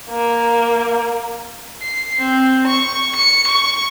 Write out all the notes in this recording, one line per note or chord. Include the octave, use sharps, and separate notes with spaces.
A#3
C7
C4
C#6
C#7
C#6